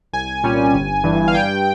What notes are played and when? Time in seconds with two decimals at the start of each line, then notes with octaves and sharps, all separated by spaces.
0.13 C2 G#5
0.43 A#2 G3 C#4
0.74 G1
1.04 G2 E3
1.28 F5
1.34 G2 G5